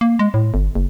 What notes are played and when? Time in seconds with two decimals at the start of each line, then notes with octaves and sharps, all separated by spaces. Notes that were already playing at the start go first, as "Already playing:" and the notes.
0.01 A#3
0.19 G#3
0.34 A2
0.54 G1
0.75 F#1